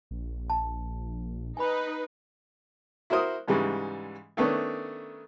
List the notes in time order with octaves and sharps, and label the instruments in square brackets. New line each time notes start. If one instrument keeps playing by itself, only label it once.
[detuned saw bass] A#1
[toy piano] A5
[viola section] D#4 B4 [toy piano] G#5 B5
[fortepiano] E4 F#4 A#4 C5 D#6
G#2 C#3 E3 G3 G#3
D#3 A3 B3 C#4 D4